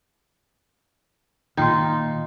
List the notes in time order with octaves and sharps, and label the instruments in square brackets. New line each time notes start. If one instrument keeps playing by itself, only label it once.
[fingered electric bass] A#2 D#3 [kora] D#4 F4 [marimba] G5 C6